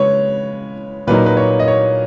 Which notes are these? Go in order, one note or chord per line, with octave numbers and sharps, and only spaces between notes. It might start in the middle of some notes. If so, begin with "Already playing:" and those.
Already playing: C#3 G#3 B4 C#5
A#2 F#3 A#3 D#4 B4
B4
C#5
D#5
C#5